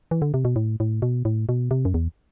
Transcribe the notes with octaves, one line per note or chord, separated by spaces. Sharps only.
E3
D3
C3
B2
A2
A2
B2
A2
B2
C3
F#2
E2